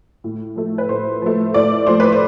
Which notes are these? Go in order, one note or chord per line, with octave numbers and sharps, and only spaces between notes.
A2
F3 A3
B4
A2 C5
F3 A3
A2 D5
F3 A3 C5
B4
C5